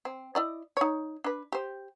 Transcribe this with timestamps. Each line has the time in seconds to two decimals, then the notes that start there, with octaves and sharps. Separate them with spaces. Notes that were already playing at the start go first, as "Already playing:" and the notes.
0.05 C4
0.35 E4 D5 D#5
0.77 D#4 C#5
1.24 D4 B4
1.52 G4 C5